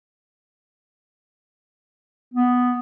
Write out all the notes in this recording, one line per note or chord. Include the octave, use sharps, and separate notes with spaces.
B3